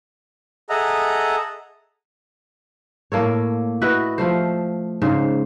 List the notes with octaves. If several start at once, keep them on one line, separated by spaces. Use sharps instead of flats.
G#4 A4 D#5 E5 F#5 A#5
A2 A#3 A4 C#5
E4 F#4 B4 D#5
F3 A3 C5
G#2 C#3 C5